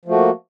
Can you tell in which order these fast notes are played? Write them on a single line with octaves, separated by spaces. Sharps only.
F3 A3 F#4 A#3